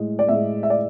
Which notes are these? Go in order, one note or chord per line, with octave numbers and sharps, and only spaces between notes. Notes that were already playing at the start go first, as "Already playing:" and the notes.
Already playing: A2 G#3
D5
A2 G#3 E5
E5
D5